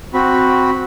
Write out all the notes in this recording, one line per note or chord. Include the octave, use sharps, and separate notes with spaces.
C4 F#4 B5